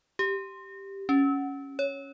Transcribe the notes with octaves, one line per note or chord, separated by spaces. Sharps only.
G4
C#4
C#5